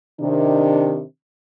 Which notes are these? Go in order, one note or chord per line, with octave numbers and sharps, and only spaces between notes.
C3 D#3 D4